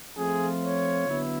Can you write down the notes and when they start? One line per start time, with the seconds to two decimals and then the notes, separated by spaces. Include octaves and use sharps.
0.17 F3 A3 C4 F4 G#4
0.62 C#5
1.07 D3 F#3 B3 E4